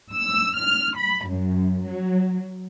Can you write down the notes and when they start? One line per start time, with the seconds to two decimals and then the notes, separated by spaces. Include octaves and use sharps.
0.13 E6
0.58 F6
0.98 B5
1.28 F#2
1.86 F#3